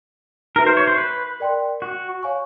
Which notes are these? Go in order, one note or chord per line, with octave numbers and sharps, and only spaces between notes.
D#4 F#4 A#4 B4 E5
C5
C#5
C5
B4
A#4 D5 G5 C6
F#4
C#5 F5 G#5 C#6